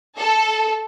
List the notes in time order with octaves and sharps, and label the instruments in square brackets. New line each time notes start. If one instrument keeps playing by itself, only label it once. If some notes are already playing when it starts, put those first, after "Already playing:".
[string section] A4